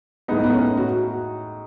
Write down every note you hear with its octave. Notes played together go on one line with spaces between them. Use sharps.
A2 G#3 B3 D#4
B3
C#4
F#4